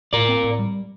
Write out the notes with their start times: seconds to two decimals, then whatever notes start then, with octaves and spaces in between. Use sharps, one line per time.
0.13 A2 A#4 D5
0.28 C4
0.44 A2
0.59 G3